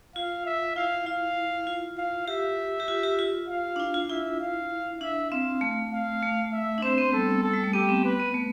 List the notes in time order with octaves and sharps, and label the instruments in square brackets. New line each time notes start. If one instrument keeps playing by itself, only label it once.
[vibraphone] F4 [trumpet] F5
[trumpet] E5
[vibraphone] E4 [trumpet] F5
[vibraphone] E4 [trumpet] F5
[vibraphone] F4
[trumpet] F5
[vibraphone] G4 [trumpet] E5
[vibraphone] G4
F4
G4
F4
[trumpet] F5
[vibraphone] D4
E4
F4
[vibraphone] E4 [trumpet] E5
[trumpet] F5
[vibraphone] D4 [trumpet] E5
[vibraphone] C4 [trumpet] F5
[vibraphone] A3
[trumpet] F5
[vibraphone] A3
[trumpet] E5
[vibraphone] D4
[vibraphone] C4 [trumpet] C5
[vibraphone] B3
[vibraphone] G3 [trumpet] A4
[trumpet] A4
[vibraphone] G3
A3
[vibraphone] B3 [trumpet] G4
[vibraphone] C4
[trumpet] B4
[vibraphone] B3
A3